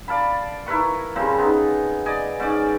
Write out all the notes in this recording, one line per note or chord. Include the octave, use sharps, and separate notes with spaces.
D5 F5 A5 B5
E4 A#4 B4 C#6
C#3 F3 G3 C4
B3 D#4 G#4
D5 D#5 G#5
G#2 C#4 D5